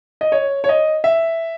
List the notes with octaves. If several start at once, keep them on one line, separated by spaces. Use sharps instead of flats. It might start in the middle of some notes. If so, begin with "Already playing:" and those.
D#5
C#5
C#5
D#5
E5